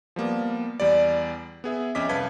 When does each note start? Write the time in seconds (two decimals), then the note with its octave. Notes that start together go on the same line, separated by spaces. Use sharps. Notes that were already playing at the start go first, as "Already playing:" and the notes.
0.16 F3 G3 A#3 B3
0.80 E2 G3 D5
1.64 B3 G#4 E5
1.95 F2 C#4 D#5 E5 D6 B6
2.09 C2 B4 F5 A5 G#6 B6